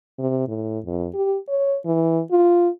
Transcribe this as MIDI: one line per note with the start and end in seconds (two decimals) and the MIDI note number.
0.19 0.46 48
0.48 0.79 45
0.85 1.08 41
1.15 1.37 67
1.49 1.77 73
1.86 2.21 52
2.31 2.69 65